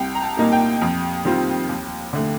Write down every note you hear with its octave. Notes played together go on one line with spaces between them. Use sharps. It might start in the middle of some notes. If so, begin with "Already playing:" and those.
Already playing: C2 G5
A#5
A5
A#2 G3 A#3 D#4
G5
F2
D#3 G3 C4 F4
D#2
D3 A3